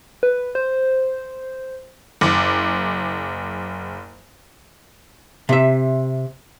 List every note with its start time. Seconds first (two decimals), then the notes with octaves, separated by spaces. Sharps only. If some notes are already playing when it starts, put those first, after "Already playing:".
0.23 B4
0.55 C5
2.21 F#1 D6
5.49 C3 E5